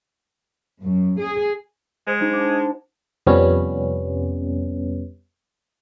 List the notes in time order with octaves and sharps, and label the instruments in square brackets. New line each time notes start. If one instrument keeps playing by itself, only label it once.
[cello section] F#2
G#4
[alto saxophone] G#3 [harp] C5
[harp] D4 D#4 F#4
A5 D6
[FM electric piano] F2 C3 G3 B3 C#4